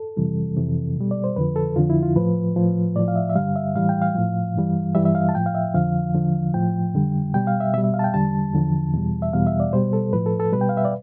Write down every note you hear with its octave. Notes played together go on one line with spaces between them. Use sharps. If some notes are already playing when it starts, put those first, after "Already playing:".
Already playing: A4
F2 C3 E3 G3
F2 C3 E3
B2 G3
D5
C5
F2 D3 F3 B4
A4
F2 D3 F3 F4
E4
F4
A2 F3 B4
A2 F3
A2 F3 D5
F5
E5
E5
G2 D3 G3 F5
E5
A2 E3 G3 F5
G5
F5
A2 F3
G2 E3 G3
G2 E3 G3 E5
E5
F5
A5
A2 F3 G5
F5
E5
F2 D3 F3 F5
E2 D3 F3
A2 F3 G5
F2 D3 G3
B2 G3 G5
F5
E5
B2 G3 E5
E5
F5
A5
G5
E2 D3 G3 A5
E2 D3 F3
E2 B2 G3
E5
E2 B2 G3 F5
E5
D5
B2 G3 C5
A4
A2 F3 B4
A4
A4
B2 G3 B4
G5
F5
E5
D5